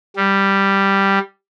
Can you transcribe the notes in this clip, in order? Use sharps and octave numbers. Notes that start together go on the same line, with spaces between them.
G3